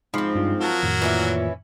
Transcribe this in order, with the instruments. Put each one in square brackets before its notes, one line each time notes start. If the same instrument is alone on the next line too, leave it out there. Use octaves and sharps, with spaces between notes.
[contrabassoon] G#2 [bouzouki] F3 C4 [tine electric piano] B5 C6 D6
[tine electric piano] G2 D4 F4
[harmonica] F#3 F#4 A#4 [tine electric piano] F4 A5 C#6
[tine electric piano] F2 A2 D#3
[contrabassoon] A#2 [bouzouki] E3 C#4 E4